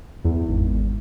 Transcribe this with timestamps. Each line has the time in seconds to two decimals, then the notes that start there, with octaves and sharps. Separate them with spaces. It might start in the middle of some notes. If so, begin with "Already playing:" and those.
0.25 E2
0.48 G#1